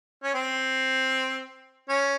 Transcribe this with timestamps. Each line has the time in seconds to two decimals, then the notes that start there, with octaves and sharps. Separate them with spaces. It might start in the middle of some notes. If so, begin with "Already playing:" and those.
0.23 C#4
0.34 C4
1.89 C#4